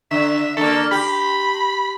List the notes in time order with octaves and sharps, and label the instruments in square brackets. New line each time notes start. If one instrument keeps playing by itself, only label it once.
[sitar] D3 [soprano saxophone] E5
[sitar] D3 A#3 [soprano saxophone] A4
[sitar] G4 [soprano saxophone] B5